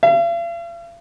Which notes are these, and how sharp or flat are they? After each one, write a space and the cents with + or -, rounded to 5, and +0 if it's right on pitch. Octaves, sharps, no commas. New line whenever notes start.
F5 -45